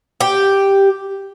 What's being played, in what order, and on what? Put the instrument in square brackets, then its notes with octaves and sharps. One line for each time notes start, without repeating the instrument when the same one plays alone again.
[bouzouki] G4